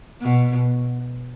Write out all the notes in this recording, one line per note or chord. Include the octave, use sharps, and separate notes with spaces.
B2